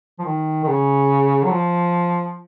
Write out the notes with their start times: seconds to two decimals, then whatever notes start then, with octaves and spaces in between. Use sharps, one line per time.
0.19 F3
0.25 D#3
0.64 D#3
0.67 C#3
1.44 F#3
1.50 F3